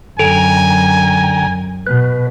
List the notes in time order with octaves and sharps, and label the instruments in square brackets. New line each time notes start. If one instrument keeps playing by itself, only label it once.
[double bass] F#2 [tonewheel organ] D3 G5 A#5 [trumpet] G#5
[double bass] B2 [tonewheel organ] B4